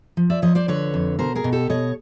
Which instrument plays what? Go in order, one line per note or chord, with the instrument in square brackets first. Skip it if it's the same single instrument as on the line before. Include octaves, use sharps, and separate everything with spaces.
[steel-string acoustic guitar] F3
D5 E5
F3 C#5 D#5
C5 D5
D3 B4 C#5
F2
B2 A#4 C5
G#4 A#4
B2
G4 A4
B2 C#5 D#5